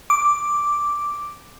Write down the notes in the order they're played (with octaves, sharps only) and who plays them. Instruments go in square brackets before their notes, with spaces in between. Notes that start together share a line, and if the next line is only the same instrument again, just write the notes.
[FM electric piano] D6